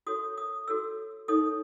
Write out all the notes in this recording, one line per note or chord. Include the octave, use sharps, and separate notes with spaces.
F#4 A4 C#5 D#6
D#6
F#4 A4 C#5 E6
D#4 A4 C#5 D#6